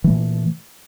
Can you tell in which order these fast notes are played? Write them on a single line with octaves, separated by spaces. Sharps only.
E3 A3 A#2